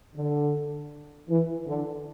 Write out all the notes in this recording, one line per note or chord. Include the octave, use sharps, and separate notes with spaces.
D3
E3
D3